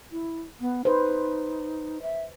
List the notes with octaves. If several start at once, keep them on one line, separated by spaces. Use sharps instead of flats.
E4
B3
D#4 B4 C5
E5